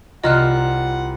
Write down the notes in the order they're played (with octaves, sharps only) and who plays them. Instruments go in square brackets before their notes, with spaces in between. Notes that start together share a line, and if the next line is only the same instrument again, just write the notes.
[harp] C2 A#5 [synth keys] F4 [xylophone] D#5 F6 F#6 [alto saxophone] F#5